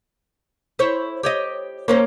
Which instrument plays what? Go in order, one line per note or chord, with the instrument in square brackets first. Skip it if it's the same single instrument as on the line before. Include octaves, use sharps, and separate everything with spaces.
[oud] E4 C5 C#5
G4 C#5 D#5
[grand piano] A#3 C#5 [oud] C#4 A#4 C5